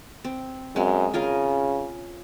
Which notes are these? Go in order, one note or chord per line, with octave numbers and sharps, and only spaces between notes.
C4
F#2 G#3 C4
C#3 F4 G#4 A#4